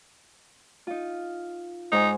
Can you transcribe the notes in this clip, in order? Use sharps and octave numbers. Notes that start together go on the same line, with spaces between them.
D#4 F4
G#2 D#4 C5 G#5